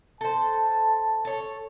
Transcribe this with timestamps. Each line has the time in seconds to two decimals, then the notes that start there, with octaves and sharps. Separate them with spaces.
0.21 A4 C5 A5
1.25 A4 C#5